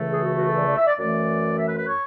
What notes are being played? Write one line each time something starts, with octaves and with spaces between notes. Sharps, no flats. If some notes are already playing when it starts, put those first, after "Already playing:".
Already playing: C#2 C#3 E3 A3
G#4
F#4
F#4
A4
D5
D5
E5
D5
F#2 E3 A3 D5
E5
B4
B4
C#5